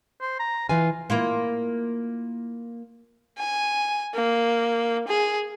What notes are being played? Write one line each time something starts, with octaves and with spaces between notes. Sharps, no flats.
C5
A#5
E3 F4 B4 G#5
A#3 E4 F4
G#5
A#3
G#4